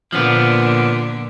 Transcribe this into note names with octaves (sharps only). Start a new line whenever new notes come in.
A#2 D3 F3 A#3 B3